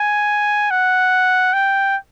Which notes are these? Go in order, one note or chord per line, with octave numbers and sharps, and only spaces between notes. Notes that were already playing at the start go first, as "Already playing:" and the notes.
Already playing: G#5
F#5
G5